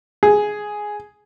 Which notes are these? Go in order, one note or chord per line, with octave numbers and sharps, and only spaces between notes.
G#4